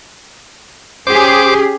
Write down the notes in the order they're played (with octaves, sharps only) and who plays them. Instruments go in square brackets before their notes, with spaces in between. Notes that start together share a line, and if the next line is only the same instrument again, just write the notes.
[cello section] C#4 G4 G#4 [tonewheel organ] C5 D6